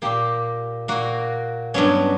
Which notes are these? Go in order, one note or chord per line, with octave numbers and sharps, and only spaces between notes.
A#2 A#3 G4
A#2 A#3 F#4
G2 F#3 B3 C#4